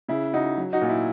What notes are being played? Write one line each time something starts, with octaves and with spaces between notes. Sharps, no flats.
C#3 E4
C#3 D#4 F#4
F#3
D#4 F#4
A#2
E4